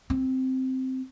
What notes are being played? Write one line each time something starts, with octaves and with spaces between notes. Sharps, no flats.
C4